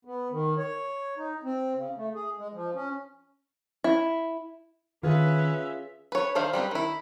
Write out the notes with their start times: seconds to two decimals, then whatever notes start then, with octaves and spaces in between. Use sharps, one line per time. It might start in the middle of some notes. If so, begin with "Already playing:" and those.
0.05 B3
0.31 D#3
0.58 C#5
1.17 D#4
1.43 C4
1.75 C#3
1.97 A3
2.15 G#4
2.38 G#3
2.54 F3
2.75 C#4
3.84 E4
5.03 D#3 C#4 F4 G#4 B4 E5
6.12 B4 C#5
6.35 D#3 D4 C5 E5 F5
6.53 G3 G#3 C4 B4
6.71 D#3 E4